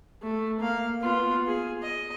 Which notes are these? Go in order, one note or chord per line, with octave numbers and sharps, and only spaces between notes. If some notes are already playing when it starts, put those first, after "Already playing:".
A3
A#3 F5
B3 F4
G#4
D#5